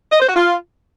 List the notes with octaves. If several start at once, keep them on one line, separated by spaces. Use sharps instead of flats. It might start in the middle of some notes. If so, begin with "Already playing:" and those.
D#5
C5
F#4
F4